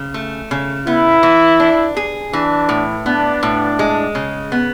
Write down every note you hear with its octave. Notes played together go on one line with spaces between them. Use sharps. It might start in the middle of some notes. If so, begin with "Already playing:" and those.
Already playing: C#3
A3
C#3
B3 E4
E3
D4
G#4
E3 D4
A2
B3 D4
A2
G#3
C#3
B3